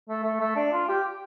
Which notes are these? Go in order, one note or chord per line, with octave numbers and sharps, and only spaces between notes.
A3
A3
A3
D4
F4
G4